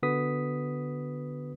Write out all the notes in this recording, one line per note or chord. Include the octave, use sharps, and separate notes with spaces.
D3 B3 F#4 B4 D#6 B6